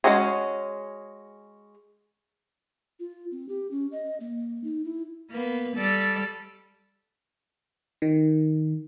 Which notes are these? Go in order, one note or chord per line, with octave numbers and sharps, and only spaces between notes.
G#3 C4 C#4 F#4 G#4
F4
C4
G4
C#4
D#5
A#3
D#4
E4
A#3 B3
G3 A4 D5
D#3